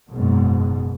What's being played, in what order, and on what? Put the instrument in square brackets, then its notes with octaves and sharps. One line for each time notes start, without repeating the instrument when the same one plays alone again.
[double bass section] F#1 G#2 B2